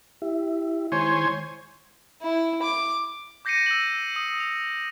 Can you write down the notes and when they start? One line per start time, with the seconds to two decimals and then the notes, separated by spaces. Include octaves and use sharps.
0.22 E4 G4 E5
0.92 D#3 G#3 E4 C5 C#5 G#5
2.22 E4
2.62 D6
3.45 D6 G6 A#6 C7 C#7 D#7
3.66 E6 F#7
4.16 D#6
4.40 F7